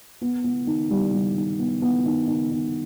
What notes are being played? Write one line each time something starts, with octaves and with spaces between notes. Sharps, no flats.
B3
B3
D#3
G3
G3
D#3
B3
B3
D#3
D#3
D#3